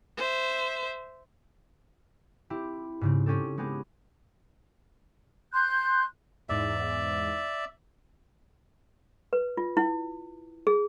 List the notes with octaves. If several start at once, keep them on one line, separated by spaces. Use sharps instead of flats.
C5 E5
C4 E4 G4
G#2 C#3 C4
C4 C#4 G4 A4
G#3 B3 G4 G#4
C6 F#6 G6
E2 G#2 D5 E5
B4
F4
E4
G#4